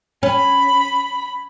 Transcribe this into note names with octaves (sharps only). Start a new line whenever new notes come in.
C#4 B5